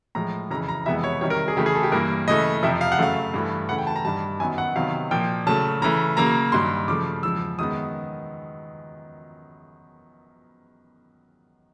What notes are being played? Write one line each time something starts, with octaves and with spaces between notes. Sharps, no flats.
A2 F3 G#3 A#5
F2 C#3 E3 A#5
A#5
F2 C3 E3 G#3 B3 E5
C#5
C3 D#3 G3 C#5
A#4
G#4
C#3 E3 A3 G4
G#4
A4
G4
G2 E3 G3 A#3 A#4
C#3 E3 A3 D#5
F2 C3 F3 E5
F5
F#5
F#2 C#3 F#3 A3 F5
G2 E3 A3
C#3 E3 A3 F#5
G5
A5
A#5
G2 D#3 G3 A5
F#2 D#3 F#3 B3 G#5
F#5
C3 D#3 F#3 B3 F5
A#2 F3 A#3 G5
C#3 F#3 A3 A5
C#3 E3 A3 A#5
C#3 F#3 A#3 A#5
G2 D#3 F#3 C6
C#3 F3 A3 D6
E2 C#3 F3 G#3 E6
F#2 D#3 G#3 B3 D#6